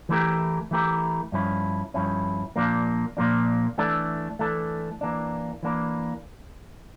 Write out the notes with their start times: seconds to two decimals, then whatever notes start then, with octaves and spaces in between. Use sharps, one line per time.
0.09 E3 A3 E4 G4 A#4
0.71 E3 A3 E4 G4 A#4
1.32 G2 F3 C#4 E4
1.94 G2 F3 C#4 E4
2.56 A#2 F3 A#3 D4
3.17 A#2 F3 A#3 D4
3.78 E3 A3 D4 A4
4.39 E3 A3 D4 A4
5.01 E3 A#3 D4
5.63 E3 A#3 D4